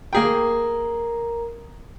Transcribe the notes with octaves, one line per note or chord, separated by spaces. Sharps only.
A#3 G#4 A#4 G5 A#5